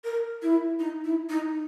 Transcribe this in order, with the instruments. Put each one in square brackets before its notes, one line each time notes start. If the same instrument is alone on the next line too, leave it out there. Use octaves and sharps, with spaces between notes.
[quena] A#4
E4
D#4
E4
D#4